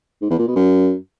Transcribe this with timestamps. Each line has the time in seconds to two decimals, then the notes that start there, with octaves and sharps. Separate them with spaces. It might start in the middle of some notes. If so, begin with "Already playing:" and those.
0.22 G#2
0.30 E2
0.39 A#2
0.47 B2
0.56 F#2